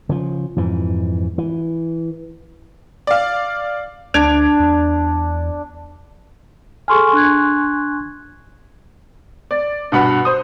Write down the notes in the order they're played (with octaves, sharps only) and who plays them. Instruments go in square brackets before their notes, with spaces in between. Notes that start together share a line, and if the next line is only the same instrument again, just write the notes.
[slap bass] C#3 F3
F2 G#2 E3
E3
[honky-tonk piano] D5 F5
[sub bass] D2 [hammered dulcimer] D4 [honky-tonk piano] G#6 D7 F7
[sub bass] E2
[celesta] G#4 A4 F6 [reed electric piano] G#5 C6 C#6
[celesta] D4 F#6 G#6
[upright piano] D5
G2 B2 F#5 B5
C5 D#6